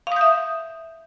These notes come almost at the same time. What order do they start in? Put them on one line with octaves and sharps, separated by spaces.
F5 D#6 G6 E5